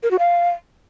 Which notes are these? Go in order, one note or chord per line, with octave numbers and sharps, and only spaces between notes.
A#4
F#4
F5